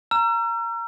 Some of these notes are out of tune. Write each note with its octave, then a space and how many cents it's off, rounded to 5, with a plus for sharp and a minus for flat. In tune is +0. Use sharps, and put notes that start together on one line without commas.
A#5 +0 E6 +45